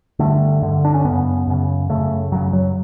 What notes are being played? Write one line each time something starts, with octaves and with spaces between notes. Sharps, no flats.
G2 D3 A3
G2 D3
D4
C#4
F#2 C#3 B3
F#2 C#3
F#2 C#3 A3
F#2 C#3 F#3
F#3